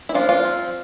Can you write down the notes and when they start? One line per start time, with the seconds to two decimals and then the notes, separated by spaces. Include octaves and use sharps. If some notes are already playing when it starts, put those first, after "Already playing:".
0.09 E4
0.14 F3 A#3 D4 F4
0.29 F4
0.45 F3 C4